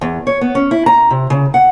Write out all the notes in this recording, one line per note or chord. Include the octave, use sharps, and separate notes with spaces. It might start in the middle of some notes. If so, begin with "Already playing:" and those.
E2
C#5
B3
C#4
E4
A#5
C3
C#3
F#5